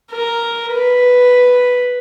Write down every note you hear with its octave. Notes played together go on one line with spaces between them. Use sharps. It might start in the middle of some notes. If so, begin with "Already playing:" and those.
A#4
B4